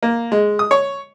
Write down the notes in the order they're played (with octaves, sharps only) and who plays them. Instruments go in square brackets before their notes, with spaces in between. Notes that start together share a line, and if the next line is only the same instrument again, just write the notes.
[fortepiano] A#3
G#3
D#6
C#5